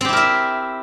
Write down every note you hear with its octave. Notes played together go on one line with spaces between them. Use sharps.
C4 E4 G4 A#4 E5